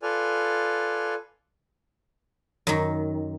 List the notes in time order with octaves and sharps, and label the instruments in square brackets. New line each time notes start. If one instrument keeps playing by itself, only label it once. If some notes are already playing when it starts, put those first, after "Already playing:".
[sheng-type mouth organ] F4 A4 B4 D5 G#5 F6
[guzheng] F#2 D#3